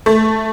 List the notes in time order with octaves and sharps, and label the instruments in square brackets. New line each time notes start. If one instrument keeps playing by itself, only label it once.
[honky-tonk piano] A3